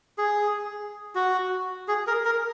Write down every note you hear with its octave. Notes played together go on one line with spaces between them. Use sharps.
G#4
F#4
G#4
A#4
A#4